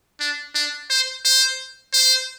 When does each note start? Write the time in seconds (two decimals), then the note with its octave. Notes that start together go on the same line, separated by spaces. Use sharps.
0.20 D4
0.55 D4
0.90 C5
1.25 C5
1.94 C5